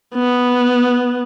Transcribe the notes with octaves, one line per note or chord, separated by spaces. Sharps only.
B3